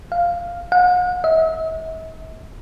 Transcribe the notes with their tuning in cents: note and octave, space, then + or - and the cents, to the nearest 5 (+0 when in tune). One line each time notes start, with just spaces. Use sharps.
F5 -5
F#5 -45
E5 -45